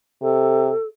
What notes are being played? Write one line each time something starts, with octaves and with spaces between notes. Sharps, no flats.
C3 A4